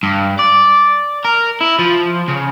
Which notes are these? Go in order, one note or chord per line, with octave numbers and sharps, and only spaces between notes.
G2
D5
A#4
E4
F3
C#3